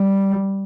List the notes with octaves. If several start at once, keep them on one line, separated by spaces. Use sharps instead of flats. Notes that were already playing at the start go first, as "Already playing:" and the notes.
Already playing: G3